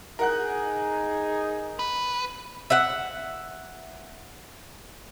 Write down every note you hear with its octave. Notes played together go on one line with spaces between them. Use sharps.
D#4 G#4 A#4 F#5 F#6
B4
E5 F#5